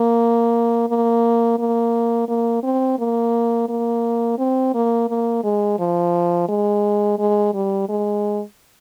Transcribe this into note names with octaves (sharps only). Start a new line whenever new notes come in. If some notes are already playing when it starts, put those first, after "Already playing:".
Already playing: A#3
A#3
A#3
A#3
C4
A#3
A#3
C4
A#3
A#3
G#3
F3
G#3
G#3
G3
G#3